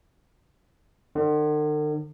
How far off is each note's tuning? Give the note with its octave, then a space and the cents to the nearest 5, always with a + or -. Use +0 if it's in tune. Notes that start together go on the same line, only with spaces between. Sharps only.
D3 +45 C#5 -45